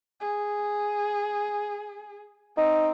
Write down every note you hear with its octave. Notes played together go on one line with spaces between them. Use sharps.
G#4
C4 D#4